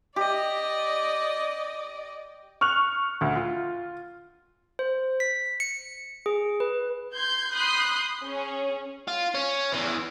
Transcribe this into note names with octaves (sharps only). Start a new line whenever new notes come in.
G4 D5 D#5
C#6 F6 F#6 F7
D2
F4
C5
B6
C#7
G#4
B4
C6 G6 G#6
B5 C6 D#6 F#6 G6 C7
C#4 G#4
F4
C#4
E2 E3